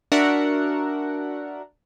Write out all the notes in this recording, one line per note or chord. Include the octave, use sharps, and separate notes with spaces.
D4 F#4 A#4 E5 F#5